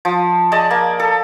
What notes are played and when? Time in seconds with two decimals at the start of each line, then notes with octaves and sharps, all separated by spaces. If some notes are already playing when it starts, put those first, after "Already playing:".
0.05 F3
0.52 G#4 D5 D#5 A5
0.70 A#3
1.00 A4